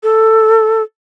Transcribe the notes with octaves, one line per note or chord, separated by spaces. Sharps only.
A4